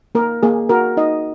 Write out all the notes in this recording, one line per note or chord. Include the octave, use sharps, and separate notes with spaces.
A#3 A#4
A#3 G#4
F#4 A#4
D#4 D#5